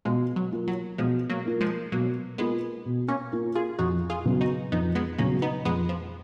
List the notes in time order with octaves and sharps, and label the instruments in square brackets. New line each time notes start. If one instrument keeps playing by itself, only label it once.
[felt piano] B2 [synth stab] F3 G#3
[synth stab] F#3
[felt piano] A#3 F4 A#4
[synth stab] F#3
[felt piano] B2 [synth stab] F3 G#3
[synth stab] F#3 A#3
[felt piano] A#3 F4 A#4
[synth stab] F3 G#3
[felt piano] B2 [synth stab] F#3 A#3
[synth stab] G#3 B3 [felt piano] A#3 F4 A#4
[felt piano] B2
[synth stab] A#3 C#4
[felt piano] A#3 F4 A#4
[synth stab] F4 G#4
[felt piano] F2 [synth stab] D#4 F#4
[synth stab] F4 G#4
[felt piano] C#3 F#3 B3
[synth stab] D#4 F#4
[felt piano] F2 [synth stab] B3 D#4
[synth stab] G#3 B3
[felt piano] C#3 F#3 B3 [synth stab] A#3 C#4
[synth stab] B3 D#4
[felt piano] F2 [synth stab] G#3 B3
[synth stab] F3